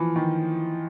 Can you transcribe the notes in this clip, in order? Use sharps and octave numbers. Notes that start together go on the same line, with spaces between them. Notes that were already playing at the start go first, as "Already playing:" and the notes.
Already playing: E3 F3
D#3